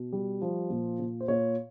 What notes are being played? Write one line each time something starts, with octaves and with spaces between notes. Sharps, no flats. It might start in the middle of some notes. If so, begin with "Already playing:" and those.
Already playing: B2
G3
F3
A#2
A#2
C5
A#2 C#5